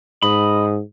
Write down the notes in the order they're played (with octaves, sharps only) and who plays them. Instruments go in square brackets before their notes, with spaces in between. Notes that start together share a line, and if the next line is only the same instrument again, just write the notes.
[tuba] G#2 [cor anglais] D#5 [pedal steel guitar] B5